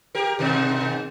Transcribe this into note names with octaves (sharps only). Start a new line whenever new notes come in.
G4 A#4
G#2 B2 D#3